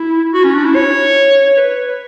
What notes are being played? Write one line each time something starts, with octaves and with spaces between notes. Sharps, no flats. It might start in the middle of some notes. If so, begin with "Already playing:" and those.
Already playing: E4
F#4
C#4
D4
E4
C#5
B4